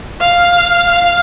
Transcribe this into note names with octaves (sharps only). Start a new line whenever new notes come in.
F5
F5